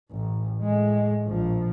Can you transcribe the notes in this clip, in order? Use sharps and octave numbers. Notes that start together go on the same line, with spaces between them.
A1
A2 G#3
A#1 F3